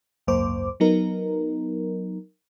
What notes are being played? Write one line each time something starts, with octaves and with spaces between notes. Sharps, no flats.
G#1 C#2 F#2 A#3 C5 D6
F#3 B3 D#4 A#4